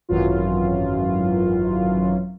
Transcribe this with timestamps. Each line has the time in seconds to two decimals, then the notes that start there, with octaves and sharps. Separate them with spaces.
0.09 G#1 F#2 E3 F#3 F4